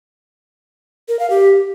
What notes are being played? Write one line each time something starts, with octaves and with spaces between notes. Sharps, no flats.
A#4
F5
G4